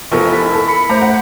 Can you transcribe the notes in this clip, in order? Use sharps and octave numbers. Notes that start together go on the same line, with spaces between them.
F1 F3 B3 A4 A#4 C#6
E4 B6
A4
B5 B6 C#7
A3 C5 A#5
F#5